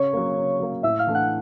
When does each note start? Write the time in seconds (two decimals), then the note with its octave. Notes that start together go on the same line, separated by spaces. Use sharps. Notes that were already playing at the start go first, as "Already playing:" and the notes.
Already playing: C#3 C#5 C#6
0.13 F#3 A#3
0.37 C#3
0.60 F#3 A#3
0.83 A2 E5 E6
0.99 F5 F6
1.07 E3 A3 D4
1.15 F#5 F#6